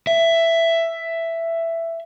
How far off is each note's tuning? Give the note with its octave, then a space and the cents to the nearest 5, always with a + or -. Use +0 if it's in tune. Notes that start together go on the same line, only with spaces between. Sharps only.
E5 +10